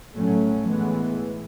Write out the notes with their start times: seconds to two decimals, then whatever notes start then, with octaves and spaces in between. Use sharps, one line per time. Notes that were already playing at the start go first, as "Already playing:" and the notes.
0.13 A2 F#3 A3 C#4
0.65 A2 E3 G#3 B3